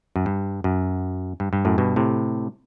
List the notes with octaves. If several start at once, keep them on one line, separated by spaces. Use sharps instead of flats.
F#2
G2
F#2
G2
G2
F#2 A2
G2 B2
A2 C3